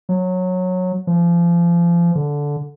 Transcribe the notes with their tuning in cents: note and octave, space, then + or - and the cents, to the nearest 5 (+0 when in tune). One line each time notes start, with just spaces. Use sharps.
F#3 -15
F3 -30
D3 -10